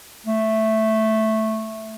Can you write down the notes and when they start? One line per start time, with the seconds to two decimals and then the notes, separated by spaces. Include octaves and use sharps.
0.26 A3